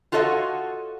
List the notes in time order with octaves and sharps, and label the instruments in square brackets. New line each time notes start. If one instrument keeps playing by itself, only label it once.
[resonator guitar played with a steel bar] F4 F#4 A4 C#5 D#5 F#5